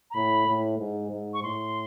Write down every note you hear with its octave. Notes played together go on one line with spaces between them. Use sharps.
A#5
A2 B5
A2
G#2
G#2
C#6
A2 C6